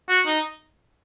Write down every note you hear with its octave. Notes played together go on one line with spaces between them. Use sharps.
F#4
D#4